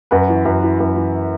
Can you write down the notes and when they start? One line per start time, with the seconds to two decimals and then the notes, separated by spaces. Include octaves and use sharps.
0.11 F#2 F#4 B4
0.29 E3
0.45 F#2
0.63 E3
0.80 F#2
0.96 E3